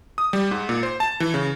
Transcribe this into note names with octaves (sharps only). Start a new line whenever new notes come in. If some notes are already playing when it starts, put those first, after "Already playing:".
D#6
G3
G#2
A#2
C5
A5
E3
C#3